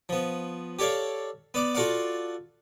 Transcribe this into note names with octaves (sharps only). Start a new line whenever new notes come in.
F3 B3
G4 A4 C#5 D5 F5
B3 D5 D6
F4 F#4 A4 D5 F5 F#5